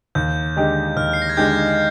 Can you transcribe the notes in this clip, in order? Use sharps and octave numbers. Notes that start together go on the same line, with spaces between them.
D#2 G6
D3 G#3 D#4 G4
D#2 F6
C7
A#6
G#6
D3 G#3 D#4 G4 G6